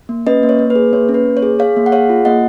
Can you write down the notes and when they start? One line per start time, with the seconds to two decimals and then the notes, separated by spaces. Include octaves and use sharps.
0.09 A#3
0.27 C#4 B4 D#5
0.43 A#3
0.49 C#5
0.59 A#3
0.70 B4
0.75 G#4
0.93 A#3 C#5
1.09 C#4
1.14 B4
1.26 A#3
1.37 C#5
1.43 G#4
1.59 G#4 C#5 F5
1.76 A#3
1.86 F#5
1.92 G#4 C#5 F5
2.09 F4
2.25 A#3 D#5 F#5